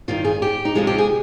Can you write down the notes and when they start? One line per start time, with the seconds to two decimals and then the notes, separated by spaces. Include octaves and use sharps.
0.08 G2 D#3 G3 F4
0.24 G#4
0.42 G4
0.65 D#4
0.75 D2 C3 F3 G#3 F4
0.87 G4
0.98 G#4